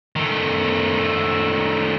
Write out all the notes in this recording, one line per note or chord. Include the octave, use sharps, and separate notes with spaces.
D#3 A3